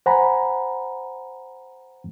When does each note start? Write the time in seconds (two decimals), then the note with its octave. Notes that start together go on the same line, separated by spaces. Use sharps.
0.06 C5 F#5 G#5 A#5 B5